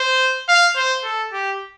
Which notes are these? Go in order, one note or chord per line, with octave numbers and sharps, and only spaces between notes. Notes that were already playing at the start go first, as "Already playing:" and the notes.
Already playing: C5
F5
C5
A4
G4